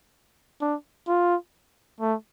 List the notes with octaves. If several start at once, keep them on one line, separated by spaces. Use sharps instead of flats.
D4
F4
A3